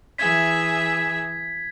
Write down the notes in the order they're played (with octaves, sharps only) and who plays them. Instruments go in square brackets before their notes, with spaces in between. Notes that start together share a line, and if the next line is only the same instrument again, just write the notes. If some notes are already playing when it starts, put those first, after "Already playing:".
[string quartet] E3 G#4 E5 [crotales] G#6 B6